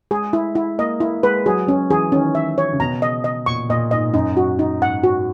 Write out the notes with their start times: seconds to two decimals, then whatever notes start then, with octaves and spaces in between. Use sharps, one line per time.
0.11 G#3 G#4
0.33 E4
0.55 E4
0.78 A#3 D#5
1.00 A#3 E4
1.23 G#3 B4
1.46 F#3 G#4
1.67 F#3 C#4
1.90 E3 G#4
2.12 D#3 C#4
2.35 E5
2.58 C#5
2.73 C#3
2.80 B2 A#5
3.02 D#5
3.24 D#5
3.46 A#2 C#6
3.69 A#2 D#5
3.91 G#2 D#5
4.14 F#2 D#4
4.37 F#4
4.59 D#4
4.81 G#2 F#5
5.03 F#4